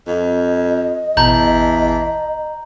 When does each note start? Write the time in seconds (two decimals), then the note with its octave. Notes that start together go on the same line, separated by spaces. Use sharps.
0.07 F2 D#5
1.17 A1 E2 B2 A5 A#5 G6 F#7